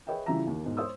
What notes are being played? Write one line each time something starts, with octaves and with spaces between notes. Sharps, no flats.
G#4 B4 C#5 D#5 E5 G5
C#3 E3 G3 F4 E5 A#5
D#2 A#3
B1 G#2
C5 C#5 D#6 E6